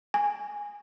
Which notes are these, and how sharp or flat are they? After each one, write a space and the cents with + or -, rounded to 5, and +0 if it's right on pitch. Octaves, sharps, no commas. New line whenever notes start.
G#5 -15